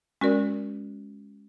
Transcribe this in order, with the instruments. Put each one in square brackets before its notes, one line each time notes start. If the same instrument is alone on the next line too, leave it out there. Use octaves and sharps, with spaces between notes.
[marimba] G#3 C#4 F#4 A#4 D5